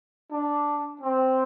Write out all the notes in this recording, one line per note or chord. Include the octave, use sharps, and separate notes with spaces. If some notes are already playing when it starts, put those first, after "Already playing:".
D4
C4